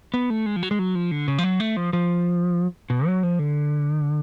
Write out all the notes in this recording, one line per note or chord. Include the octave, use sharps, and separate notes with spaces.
B3
A3
G#3
F3
F#3
G#3
F#3
F3
D3
C#3
F3
F#3
A3
F3
F3
B2
F#3
F3
D3